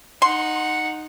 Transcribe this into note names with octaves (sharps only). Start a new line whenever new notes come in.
D#4 F#5 C6